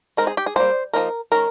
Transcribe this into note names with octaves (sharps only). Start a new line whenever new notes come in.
G#3 C4 D#4 A#4
G#4
G4
G#4
G3 A#3 D#4 C5
F3 A#3 D#4 A#4
D#3 G#3 C#4 A#4